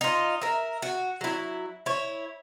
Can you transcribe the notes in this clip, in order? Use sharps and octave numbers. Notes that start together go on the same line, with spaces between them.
D#4 F4
A#4 E5
F#4
F#3 E4
E4 C#5